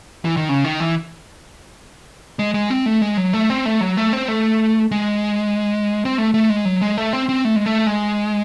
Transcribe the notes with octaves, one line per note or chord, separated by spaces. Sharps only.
E3
D#3
C#3
D#3
E3
G#3
G#3
C4
A3
G#3
F#3
A3
C4
A3
F#3
A3
C4
A3
G#3
C4
A3
A3
G#3
F#3
G#3
A3
C4
C4
A3
G#3
A3
G#3